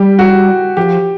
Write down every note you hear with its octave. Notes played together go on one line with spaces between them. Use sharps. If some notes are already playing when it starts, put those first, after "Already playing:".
Already playing: G3 G4
F#4
F3 G4